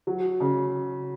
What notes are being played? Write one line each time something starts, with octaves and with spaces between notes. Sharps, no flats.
F#3
C#3